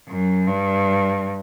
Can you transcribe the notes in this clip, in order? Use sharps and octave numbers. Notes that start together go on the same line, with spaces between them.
F#2
G2